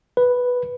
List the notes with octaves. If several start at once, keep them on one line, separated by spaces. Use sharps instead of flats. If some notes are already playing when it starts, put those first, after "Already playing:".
B4